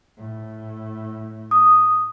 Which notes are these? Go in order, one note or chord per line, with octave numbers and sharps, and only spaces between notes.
A2
D#6